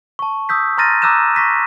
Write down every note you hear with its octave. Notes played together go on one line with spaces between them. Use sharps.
A5 C#6
D#6 E6 G6 B6
A#5 C6 F6 A6 A#6 D#7
A#5 D6 E6 F#6 G6 E7
C#6 A#6 B6 D#7